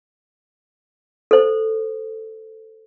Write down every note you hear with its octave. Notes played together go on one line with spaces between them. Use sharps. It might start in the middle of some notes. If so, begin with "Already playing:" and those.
A4 C5